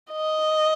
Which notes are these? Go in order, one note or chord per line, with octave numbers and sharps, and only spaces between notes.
D#5